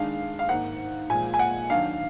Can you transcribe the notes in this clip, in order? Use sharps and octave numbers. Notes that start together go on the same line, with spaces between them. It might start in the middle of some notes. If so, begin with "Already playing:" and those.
Already playing: D#3 G#3 D4 F5
F5
G#2 D#3 A#3 D#4 F#5
A#2 F3 G#3 G#5
G#5
F#5
D#3 F#3 D4 F5